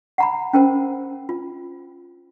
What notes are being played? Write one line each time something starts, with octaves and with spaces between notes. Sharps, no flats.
F#5 A#5 B5
C#4 A#4 C5
F4